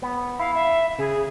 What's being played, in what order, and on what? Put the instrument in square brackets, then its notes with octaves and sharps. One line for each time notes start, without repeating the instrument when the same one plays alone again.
[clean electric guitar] B3
[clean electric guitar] E4 [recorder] F5
[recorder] E5
[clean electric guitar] C#3 [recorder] G#4